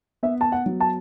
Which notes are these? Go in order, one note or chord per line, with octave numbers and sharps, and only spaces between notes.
B3 E5
A5
F#5
F#3
A5